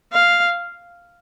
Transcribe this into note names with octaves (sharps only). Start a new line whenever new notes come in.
F5